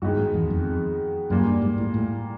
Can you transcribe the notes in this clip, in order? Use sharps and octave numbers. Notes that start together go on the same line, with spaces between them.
G2 D#3 G#3 B3 D#4 F#4
G#2
E2
F2
F#2 A#2 G3 A#3
G2
G#2
A2
A2